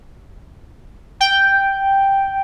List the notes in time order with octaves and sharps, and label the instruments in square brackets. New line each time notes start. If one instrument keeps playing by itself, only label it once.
[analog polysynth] G5